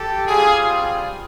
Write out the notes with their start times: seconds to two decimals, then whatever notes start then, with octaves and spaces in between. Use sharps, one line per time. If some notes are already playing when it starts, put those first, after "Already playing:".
Already playing: G4 A4
0.27 G3 C4 F4 G#4